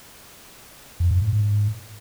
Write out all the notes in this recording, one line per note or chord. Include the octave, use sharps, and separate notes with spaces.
F2
F#2
G#2
G#2